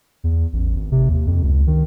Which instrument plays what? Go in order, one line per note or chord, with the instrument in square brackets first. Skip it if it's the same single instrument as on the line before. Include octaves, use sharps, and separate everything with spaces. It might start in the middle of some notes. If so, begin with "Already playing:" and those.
[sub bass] E2
A1
G#1
C3
D#2
F2
C#2
D#3